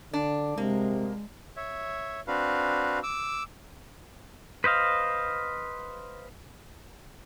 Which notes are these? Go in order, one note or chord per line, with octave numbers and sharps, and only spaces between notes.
D3 D4
C3 G#3 A#3
C#5 E5
C4 D4 F#4 B4 F5
D6 E6
B4 C5 D#5 F5